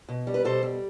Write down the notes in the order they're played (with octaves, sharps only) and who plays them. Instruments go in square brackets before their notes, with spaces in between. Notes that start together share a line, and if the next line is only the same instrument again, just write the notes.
[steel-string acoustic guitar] B2
G3
B4
B2 A4 C5
G3